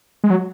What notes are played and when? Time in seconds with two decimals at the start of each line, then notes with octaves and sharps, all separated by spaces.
0.24 G#3
0.30 F#3